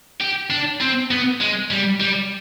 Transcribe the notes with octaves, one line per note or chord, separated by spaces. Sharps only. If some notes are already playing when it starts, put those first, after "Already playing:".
G4
D4
C4
B3
G#3
G3
G3